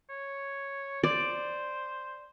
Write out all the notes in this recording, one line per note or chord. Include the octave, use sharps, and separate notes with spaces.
C#5
C5 D5